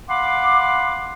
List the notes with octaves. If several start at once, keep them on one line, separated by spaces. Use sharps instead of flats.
F5 F#5 B5 C6 D6